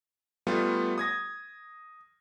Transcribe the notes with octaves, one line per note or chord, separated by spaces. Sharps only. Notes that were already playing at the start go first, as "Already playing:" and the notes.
G3 A3 B3 F4
D#6 G#6 A#6